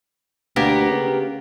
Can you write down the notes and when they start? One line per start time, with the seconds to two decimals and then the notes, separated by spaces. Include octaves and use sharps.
0.56 D2 A#3 B3 G4
0.90 C#3